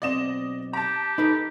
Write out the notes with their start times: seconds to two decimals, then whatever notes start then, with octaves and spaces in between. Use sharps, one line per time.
0.02 B1 C4 D5 D#5 E7
0.73 G4 A5 A#5
1.18 D#4 A4 B4 B5